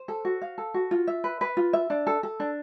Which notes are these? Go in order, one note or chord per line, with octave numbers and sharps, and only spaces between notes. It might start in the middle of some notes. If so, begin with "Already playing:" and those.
Already playing: C5
A4
F#4
F5
A4
F#4
F4
E5
B4
B4
F4
E5
D4
A4
A4
D4